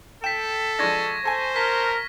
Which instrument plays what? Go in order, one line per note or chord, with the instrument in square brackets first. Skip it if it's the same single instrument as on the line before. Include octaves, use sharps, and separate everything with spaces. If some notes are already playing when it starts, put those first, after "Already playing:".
[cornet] A4 [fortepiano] G5 [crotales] B6 E7
[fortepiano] F3 G#3 D4 [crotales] C#6 G#6 A#6
[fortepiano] A4 G#5 [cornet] C5
[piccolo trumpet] A#4 [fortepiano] A5 [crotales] F6 B6